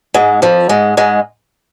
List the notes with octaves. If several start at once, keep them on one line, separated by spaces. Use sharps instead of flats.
G#2 G#3
F2 F3
G#2 G#3
G#2 G#3